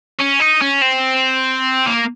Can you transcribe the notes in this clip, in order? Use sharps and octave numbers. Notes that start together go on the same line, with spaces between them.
C#4
D#4
C#4
C4
A#3